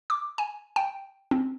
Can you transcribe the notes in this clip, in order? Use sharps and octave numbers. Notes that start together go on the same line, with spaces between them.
D6
G#5
G5
C4